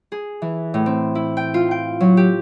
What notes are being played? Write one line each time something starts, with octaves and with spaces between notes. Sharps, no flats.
G#4
E3
A2
C4
E4
G5
F4
G5
F#3
G4